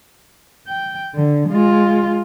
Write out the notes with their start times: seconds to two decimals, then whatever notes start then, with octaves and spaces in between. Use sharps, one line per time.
0.67 G5
1.15 D3
1.49 G#3 F4